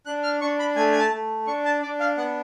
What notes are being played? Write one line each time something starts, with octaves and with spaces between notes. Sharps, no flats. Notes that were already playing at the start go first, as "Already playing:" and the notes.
D4 F#6
F6
D4 C#6
B5
A3 G#5
G#5
A5
A3
D4 C#6
A5
D4 D5
F5
B3 F#5